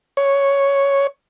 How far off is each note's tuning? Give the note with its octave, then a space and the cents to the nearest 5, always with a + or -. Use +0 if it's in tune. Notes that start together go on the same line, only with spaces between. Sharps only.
C#5 +5